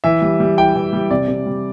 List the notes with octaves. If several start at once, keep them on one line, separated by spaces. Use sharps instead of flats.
E3 E5
G3
G3
E4 G5
E3
G3
C3 D5
C3
G3